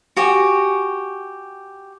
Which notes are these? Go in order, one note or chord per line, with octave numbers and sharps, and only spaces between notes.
F#4 G4 G#5